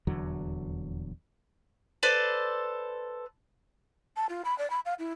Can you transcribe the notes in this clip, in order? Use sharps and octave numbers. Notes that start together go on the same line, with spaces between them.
D#1 E2 D3 F#3
A4 B4 C5 D5
A5
F4
B5
D5
B5
F5
E4